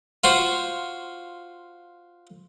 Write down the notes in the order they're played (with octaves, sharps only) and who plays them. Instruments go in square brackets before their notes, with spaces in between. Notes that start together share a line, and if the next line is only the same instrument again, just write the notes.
[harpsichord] F4 F#4 C5